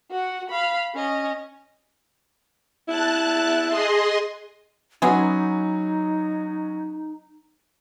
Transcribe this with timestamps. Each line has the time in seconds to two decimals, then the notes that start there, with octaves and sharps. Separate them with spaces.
0.11 F#4 F#5
0.50 F5 B5
0.95 C#4 D#5
2.88 E4 A5 F#6
3.69 G#4 D#5 C6
5.02 F#3 G#3 B3 C#4 D#4 F#4 G#4